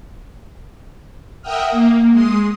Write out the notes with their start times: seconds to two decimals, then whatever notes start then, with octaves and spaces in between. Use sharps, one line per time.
1.42 A#4 E5 F#5 G5 D#6 F6
1.71 A#3
2.11 G#3 C6 D#6